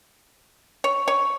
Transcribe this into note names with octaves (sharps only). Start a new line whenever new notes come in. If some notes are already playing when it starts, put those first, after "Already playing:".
C#5
C#5